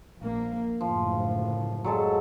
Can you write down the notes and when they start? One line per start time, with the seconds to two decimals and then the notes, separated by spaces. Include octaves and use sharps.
0.19 A#1 A#3
0.81 F#1 D2 A2 F3
1.85 F#3 G#3 A4